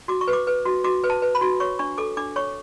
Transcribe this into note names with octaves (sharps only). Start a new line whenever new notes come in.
F#4 D6
C#6
B4
D6
B4
F#4
F#4 D6
B4
A5
B4
B5
F#4
C#5 C#6
D4 C#6
A4 D6
D4 D6
C#5 C#6